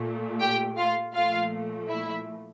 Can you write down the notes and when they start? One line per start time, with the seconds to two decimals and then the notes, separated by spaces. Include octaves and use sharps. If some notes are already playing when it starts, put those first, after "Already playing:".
Already playing: A#2 A3
0.40 G4 G5
0.77 F4 F5
1.14 A#2 F3 A3 F4 F5
1.88 E4 E5